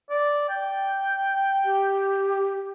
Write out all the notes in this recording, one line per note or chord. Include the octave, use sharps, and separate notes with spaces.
D5
G5
G4